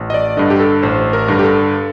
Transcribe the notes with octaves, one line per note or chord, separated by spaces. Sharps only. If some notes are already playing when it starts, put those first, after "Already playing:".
Already playing: A1
D#5
D5
G2 D3 D#5
G4
A4
A1 C5
A#4
G2 D3
G4
A4